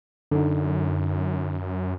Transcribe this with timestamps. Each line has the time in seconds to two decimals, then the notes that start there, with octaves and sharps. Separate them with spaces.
0.31 F#2 D3 D#4